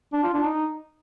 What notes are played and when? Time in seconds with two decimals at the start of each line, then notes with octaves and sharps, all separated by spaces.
0.13 D4
0.23 F4
0.33 D4
0.44 D#4